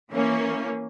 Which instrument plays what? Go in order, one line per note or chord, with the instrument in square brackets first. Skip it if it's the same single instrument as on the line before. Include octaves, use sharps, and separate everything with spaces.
[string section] E3 A#3 C#4